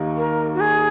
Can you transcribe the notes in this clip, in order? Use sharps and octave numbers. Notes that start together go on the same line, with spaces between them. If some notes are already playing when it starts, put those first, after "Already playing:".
Already playing: D#2 D#3 A#3 D#4
A#4
F#4
G#4